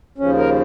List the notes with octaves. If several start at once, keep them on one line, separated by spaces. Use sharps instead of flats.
D#2 C#3 F3 C#4
A#4